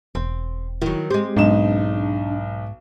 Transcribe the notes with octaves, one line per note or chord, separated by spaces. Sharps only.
E1 C4
D#3 F#3 E4
G#3 C4 G4
B1 G#2 D4 D#4 E7